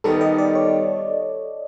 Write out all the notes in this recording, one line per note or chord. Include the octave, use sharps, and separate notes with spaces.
D#3 G3 B3 D#4 A4
D#5
D5
C#5